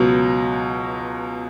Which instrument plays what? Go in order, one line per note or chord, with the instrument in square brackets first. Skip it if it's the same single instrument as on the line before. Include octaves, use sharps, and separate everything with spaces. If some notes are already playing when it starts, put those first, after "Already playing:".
Already playing: [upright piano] C#2 B2 F#3